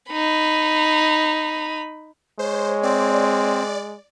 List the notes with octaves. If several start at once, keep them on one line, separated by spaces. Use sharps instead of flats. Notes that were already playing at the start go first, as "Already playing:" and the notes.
D#4 B5
G#3 C5 C#5
C4 D5